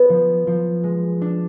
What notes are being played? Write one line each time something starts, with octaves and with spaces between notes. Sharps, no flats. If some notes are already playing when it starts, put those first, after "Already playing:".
Already playing: B3
F3
F3
G#3
D4